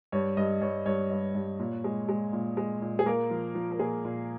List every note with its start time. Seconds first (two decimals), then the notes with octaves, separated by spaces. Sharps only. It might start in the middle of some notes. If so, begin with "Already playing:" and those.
0.12 G2 C#5
0.37 G2 D#5
0.61 G2 C#5
0.86 G2 C#5
1.10 G2
1.35 G2
1.60 A#2
1.84 G#3
2.09 G#3
2.33 A#2
2.57 G#3
2.82 A#2
2.99 G#4
3.06 A#3 A#4
3.31 F3
3.55 F3
3.72 A#4
3.79 A#2 G#4
4.05 A#2